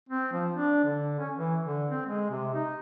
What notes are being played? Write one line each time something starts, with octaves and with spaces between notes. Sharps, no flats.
C4
F3
D4
D3
C#4
E3
D3
C4
G#3
C3
D#4